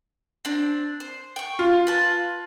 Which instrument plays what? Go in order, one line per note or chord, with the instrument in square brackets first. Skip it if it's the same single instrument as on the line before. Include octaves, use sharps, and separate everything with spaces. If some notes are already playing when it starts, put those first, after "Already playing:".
[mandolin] C4 D4
C5
G5 C#6
[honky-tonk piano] F4
[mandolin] B4 A5